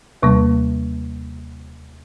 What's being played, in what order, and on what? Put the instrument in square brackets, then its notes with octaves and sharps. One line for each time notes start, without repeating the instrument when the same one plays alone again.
[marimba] D#2 C3 G3 A#3